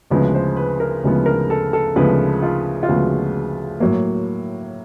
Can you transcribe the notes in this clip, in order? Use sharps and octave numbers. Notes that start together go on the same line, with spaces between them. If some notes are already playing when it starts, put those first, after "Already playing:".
D2 C#3 F3 G#3 B3 B4
C5
B4
A#4
D2 C#3 F3 G#3 B3
A#4
A4
A4
D2 C#3 F3 G#3 B3 B4
F4
F4
D2 C#3 F3 G#3 B3 F#4
A2 F#3 A#3